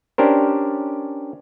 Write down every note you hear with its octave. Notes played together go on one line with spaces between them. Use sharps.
C#4 D4 G4 A#4 C5